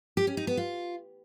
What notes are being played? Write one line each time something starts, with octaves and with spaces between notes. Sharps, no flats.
G4
C#4
D#4
B3
F4